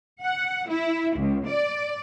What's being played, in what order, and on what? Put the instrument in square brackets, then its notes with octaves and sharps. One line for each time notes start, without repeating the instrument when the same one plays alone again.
[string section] F#5
E4
C#2
D5